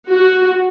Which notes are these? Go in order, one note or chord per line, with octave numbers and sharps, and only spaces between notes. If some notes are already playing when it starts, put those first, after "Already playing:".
F#4